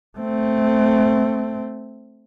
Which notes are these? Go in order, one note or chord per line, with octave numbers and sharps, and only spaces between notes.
A3 C4